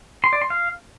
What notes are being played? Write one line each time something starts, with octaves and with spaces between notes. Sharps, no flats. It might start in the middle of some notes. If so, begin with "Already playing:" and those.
C6
D5
C6
F5